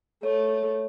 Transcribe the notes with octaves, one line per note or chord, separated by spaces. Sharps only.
A3 C#5